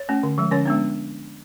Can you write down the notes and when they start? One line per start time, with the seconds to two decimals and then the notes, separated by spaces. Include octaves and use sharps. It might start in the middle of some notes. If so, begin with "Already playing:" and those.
Already playing: C#5
0.09 A3 C#4
0.23 D3
0.38 F3 G#3
0.51 D3 C#4 C#5
0.66 G#3 B3 D4